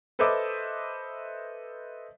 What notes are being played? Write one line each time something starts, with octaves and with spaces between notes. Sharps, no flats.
A4 B4 C5 D#5 E5 D6